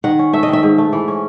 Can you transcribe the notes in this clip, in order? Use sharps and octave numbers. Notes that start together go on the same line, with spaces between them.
D#3 F#5
C#4
A3 E5
D#5
D#3 E5
G#2
A3
E3
C#4